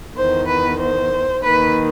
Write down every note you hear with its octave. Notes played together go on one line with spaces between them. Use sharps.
E2 D#3 C5
B4
C5
D#2 D#3 B4